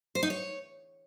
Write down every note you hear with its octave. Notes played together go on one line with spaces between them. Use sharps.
C5
D#4
C#5